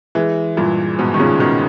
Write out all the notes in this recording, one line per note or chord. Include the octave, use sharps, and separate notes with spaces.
E3 G#3
G2 A#2
G#2 B2
D#3
A#2 C#3
B2 D#3